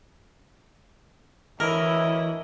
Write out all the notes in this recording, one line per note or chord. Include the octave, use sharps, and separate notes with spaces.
D2 E3 C#4 E4 A#4 D#5